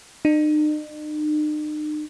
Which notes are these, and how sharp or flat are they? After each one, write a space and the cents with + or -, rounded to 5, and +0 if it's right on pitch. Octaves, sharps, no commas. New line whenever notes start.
D#4 -45